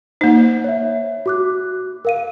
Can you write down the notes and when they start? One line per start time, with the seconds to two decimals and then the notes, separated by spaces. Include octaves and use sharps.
0.21 A#3 D#4 C5
0.64 C#5 E5
1.26 F#4 D6 F#6
2.05 A#4 F5 D#7